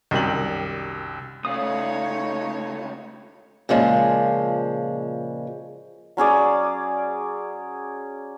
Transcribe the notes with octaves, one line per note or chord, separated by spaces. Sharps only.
C2 F#2 D#3 G3 G4 F#7
D2 C#3 A3 D#4 C#5 D5 F5 D#6
A#2 C#3 F3 G#3
F#3 C#4 G#4 D5